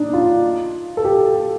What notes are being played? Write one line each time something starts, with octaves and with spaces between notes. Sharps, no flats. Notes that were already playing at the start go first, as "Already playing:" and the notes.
Already playing: D4 D#4
F4
A4
G4